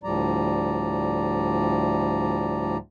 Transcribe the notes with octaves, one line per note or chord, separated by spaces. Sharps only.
D2 A2 F3 G3 D5 A#5